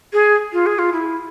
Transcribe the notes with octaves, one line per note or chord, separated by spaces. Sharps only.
G#4
F4
G#4
F4
E4